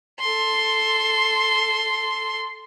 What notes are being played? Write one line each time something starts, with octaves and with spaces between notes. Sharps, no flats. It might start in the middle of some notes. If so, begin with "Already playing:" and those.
A4 C6